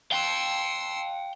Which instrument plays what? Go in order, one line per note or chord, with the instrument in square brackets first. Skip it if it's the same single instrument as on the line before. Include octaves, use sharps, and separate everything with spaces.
[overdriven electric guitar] F5 G5 [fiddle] C6 E6